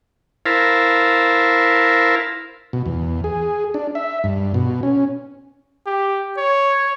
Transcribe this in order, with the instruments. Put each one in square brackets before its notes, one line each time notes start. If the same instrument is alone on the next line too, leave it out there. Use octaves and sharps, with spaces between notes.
[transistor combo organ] E4 A#4 C5 F5 A5 B5
B2
E2
G#4
D4
E5
G2
B2
C#4
[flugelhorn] G4
C#5